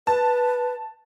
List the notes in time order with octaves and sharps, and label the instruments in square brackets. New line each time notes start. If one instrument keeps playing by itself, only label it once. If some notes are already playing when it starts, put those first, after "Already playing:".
[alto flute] B4 [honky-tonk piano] A5